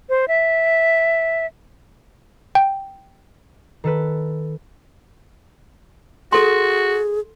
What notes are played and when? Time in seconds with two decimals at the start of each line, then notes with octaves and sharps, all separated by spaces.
0.09 C5
0.28 E5
2.55 G5
3.84 D#3 A4 B4
6.32 F#4 G#4 A4 C6